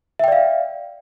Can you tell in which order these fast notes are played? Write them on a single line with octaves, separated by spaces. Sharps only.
E5 G5 D5 F5